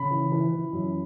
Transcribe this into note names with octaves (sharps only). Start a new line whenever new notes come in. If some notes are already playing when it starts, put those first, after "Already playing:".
Already playing: C#3 B5
E3
E3
E3
F#2